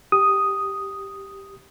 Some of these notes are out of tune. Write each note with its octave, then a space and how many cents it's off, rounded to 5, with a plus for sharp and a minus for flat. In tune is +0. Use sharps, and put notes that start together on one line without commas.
G4 +0 D#6 +0